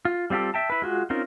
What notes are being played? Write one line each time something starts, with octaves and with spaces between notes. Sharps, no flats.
F4
G3 C4 F4 G4 A4
E5 G5 A5
E4 B4
G#3 F4 F#4
C4 C#4 D#4 F4 A#4